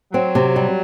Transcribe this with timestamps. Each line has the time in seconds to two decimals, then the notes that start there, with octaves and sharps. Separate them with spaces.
0.13 F#3 C4
0.35 C3
0.56 G3